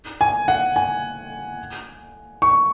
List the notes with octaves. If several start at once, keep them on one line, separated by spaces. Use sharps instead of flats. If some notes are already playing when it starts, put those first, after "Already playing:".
G#5
F#5
G#5
C#6